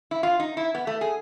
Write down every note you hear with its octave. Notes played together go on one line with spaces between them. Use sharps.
E4
F4
D#4
E4
B3
A3
G#4